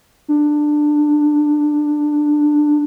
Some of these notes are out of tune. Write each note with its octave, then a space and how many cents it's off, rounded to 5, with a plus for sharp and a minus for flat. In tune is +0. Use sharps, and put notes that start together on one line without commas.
D4 +15